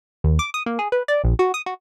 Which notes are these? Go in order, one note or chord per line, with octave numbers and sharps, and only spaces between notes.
D#2
D6
D#6
A#3
G#4
B4
D5
A#1
F#4
D#6
F#4